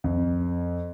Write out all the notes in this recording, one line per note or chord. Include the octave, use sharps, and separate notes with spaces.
F2